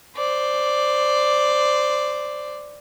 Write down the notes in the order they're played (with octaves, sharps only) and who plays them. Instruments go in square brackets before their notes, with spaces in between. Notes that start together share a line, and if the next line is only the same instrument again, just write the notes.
[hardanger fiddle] C5 D5